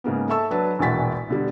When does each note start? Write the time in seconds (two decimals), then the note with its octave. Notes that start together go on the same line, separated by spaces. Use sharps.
0.04 G#2 C#3 A#3 B3
0.29 A4 E5 A5 C#6 E6
0.51 F#3 D4 B4 A5
0.79 E1 A#1 E3 F#4 A6 B6
1.29 B2 D3 G3